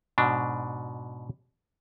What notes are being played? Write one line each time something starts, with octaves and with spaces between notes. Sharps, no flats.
G#2 B2 D4